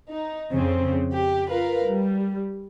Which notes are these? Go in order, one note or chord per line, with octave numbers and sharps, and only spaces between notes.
D#4
F2 C#3 C4
G4
F4 A#4 B4 F5
G3